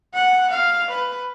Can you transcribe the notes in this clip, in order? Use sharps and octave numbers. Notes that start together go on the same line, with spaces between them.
F#5
F5
B4